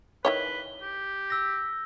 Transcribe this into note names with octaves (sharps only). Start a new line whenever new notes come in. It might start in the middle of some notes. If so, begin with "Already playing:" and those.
D#3 E4 B4 C#5 G7
G4
E6 A#6